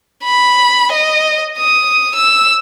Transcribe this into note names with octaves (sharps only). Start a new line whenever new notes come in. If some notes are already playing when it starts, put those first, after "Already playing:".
B5
D#5
D#6
E6